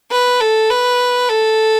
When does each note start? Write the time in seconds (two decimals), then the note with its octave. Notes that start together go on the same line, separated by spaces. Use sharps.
0.11 B4
0.41 A4
0.70 B4
1.29 A4